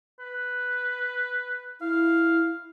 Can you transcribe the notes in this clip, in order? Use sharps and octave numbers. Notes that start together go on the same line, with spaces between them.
B4
E4 F5